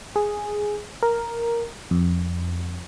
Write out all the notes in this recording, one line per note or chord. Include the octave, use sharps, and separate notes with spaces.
G#4
A#4
F2